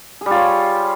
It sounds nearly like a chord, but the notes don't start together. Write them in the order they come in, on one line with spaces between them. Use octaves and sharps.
G#4 G3 F4 C#5